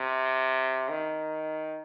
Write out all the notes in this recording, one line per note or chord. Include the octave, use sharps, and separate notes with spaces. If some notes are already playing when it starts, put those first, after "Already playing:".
Already playing: C3
D#3